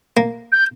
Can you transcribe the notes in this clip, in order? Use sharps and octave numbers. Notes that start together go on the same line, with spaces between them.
A#3
G6